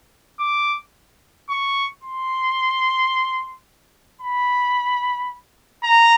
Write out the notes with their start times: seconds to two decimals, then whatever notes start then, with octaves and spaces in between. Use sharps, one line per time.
0.40 D6
1.49 C#6
2.03 C6
4.21 B5
5.84 A#5